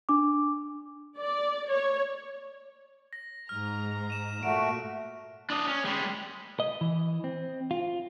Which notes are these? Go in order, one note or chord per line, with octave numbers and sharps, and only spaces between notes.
D4 D6
D5
C#5
A#6
G#2 A#5 F6
D#7 E7
A#2 A3 F#4 D7
D4 D#5
C#4
G3 G#3
D#5
E3
C4
F4